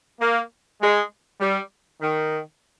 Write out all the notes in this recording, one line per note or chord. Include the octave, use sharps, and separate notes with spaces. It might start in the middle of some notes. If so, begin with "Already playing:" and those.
A#3
G#3
G3
D#3